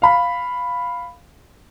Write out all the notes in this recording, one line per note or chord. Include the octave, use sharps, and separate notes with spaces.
F5 B5